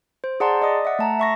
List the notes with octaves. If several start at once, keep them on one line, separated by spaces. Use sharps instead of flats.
C5
G#4 D5 F#5 A5 A#5 C6
D5 D#5 D#6
E5 F#5
A3 A5 A#5
E5 C#6 A#6